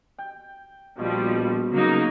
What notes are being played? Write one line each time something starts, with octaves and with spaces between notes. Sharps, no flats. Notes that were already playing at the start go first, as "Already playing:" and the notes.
G5
A#1 B2 F3 G3
C#3 F#3 A#3 D#4